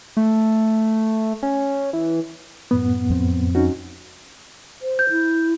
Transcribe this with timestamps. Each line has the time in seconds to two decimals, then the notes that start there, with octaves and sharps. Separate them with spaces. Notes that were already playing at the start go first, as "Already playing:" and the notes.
0.17 A3
1.43 C#4
1.93 E3
2.71 F#2 A2 B3
3.10 F2 C4
3.55 C#4 D#4 F#4
4.82 C5
4.99 G6
5.10 E4